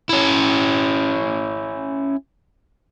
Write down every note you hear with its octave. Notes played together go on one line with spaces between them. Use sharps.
C#4 E4